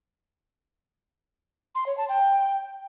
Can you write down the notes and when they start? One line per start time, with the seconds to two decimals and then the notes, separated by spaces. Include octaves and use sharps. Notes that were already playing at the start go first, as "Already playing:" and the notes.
1.75 C6
1.86 C#5
1.98 A5
2.09 G5